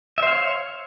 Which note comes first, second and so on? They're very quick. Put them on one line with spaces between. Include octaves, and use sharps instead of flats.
E5 C5 F5 C#5